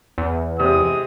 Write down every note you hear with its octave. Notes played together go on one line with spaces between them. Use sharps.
E2
C3 G#3 D#6